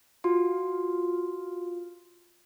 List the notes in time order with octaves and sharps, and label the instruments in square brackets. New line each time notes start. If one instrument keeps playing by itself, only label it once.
[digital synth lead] F4 [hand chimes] F#4 C6